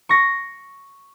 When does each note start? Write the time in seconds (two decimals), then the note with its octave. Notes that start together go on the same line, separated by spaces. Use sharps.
0.09 C#6 A#6